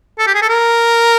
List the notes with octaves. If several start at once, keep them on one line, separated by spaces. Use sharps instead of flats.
A4
G4
G#4
A4
A#4